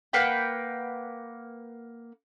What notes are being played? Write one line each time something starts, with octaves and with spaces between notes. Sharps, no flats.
A#3 B4 F#5 G5